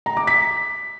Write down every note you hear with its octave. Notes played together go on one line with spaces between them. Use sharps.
A#5
D6
B6